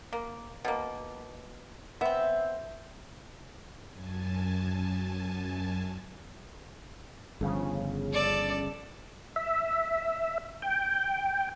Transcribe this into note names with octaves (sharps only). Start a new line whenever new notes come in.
A#3
B2 A#3
B3 C4 E5
F#2 G#5 A5
G1 C#3 F3
A4 D5
E5
G5